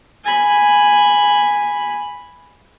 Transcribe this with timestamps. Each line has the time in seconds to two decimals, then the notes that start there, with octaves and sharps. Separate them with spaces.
0.24 G#5 B5